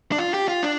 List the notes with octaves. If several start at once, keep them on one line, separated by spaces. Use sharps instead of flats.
D4
F4
G4
F4
D4